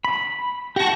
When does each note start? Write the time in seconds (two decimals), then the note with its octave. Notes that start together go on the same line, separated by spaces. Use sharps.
0.05 B5
0.76 G4 F#5 A5 C#6 A#6